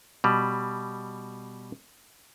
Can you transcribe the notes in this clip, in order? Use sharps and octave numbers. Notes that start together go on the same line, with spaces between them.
B2 G3